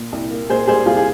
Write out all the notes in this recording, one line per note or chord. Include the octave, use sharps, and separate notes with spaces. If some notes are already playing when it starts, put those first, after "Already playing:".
Already playing: A#2
C2
A#3
A#2 G#4 C5
G3 G#4 C5
C2 F4 G#4
G#4